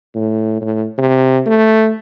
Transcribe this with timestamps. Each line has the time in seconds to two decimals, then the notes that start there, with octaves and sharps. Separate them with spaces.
0.15 A2
0.61 A2
0.98 C3
1.46 A3